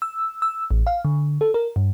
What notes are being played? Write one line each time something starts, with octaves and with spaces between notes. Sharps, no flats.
E6
E6
A1
F5
D3
A4
A#4
G2